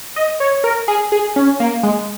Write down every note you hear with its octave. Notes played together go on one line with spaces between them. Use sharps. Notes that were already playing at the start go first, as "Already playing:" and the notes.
D#5
C#5
A#4
G#4
G#4
C#4
A#3
G#3